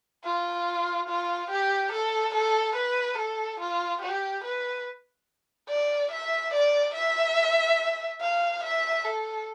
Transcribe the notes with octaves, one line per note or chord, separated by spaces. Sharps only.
F4
F4
G4
A4
A4
B4
A4
F4
G4
B4
D5
E5
D5
E5
F5
E5
A4